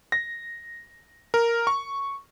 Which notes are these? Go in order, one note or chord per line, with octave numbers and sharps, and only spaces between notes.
A#6
A#4
C#6